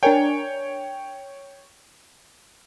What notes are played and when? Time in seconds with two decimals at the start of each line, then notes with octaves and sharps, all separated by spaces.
0.03 D4 A#4 C#5 G5 G#5